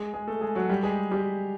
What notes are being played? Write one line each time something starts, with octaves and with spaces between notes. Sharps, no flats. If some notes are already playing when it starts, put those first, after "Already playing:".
Already playing: G#3 G#4
G#3 G#4
A3 A4
G#3 G#4
F#3 F#4
G3 G4
G#3 G#4
G3 G4